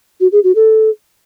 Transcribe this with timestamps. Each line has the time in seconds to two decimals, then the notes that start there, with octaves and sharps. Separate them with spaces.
0.21 F#4
0.32 G#4
0.44 F#4
0.55 A4